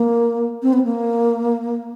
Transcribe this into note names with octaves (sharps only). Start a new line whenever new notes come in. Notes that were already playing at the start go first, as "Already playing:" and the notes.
Already playing: A#3
C4
B3
A#3